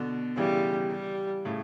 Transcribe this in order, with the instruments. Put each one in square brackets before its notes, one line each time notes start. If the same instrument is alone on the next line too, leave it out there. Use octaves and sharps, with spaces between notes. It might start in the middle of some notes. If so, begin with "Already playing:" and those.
Already playing: [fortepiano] B2 D3
[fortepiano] C#3 E3 [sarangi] G3
[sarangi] G3
[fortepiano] A2 C#3